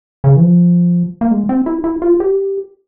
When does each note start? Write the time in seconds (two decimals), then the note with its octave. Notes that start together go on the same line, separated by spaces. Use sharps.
0.24 C#3
0.36 E3
0.41 F3
1.21 A#3
1.31 G#3
1.49 C4
1.66 E4
1.84 E4
2.02 F4
2.20 G4